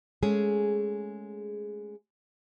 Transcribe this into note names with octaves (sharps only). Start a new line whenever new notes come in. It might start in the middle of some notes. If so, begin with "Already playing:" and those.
G#3 A3 C#4 G#4